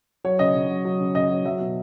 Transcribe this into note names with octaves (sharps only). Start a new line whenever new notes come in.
F#3 C#5
C#3 D#5
C#3
F#3
F#3
C#3
C#3 D#5
F#3
F#3 E5
B2